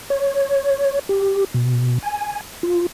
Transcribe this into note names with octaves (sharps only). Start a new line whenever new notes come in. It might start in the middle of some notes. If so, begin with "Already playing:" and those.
C#5
G4
B2
G#5
F4